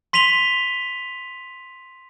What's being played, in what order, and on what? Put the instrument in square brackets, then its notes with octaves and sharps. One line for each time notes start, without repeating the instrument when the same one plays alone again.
[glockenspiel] C6 B6 D#7 F7 G7